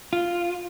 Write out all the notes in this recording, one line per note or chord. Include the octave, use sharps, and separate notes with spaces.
F4